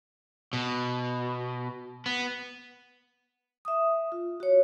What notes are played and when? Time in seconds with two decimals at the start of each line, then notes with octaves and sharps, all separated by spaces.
0.53 B2
2.06 B3
3.65 E5 D#6
4.12 F4
4.40 F#4 C#5